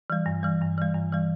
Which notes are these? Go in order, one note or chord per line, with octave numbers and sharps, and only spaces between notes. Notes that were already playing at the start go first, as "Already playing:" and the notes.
E3 G3
G2
E3 G3
G2
E3 G3
G2
E3 G3